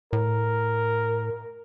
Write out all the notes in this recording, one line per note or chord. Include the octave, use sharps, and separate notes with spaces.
A2 A#4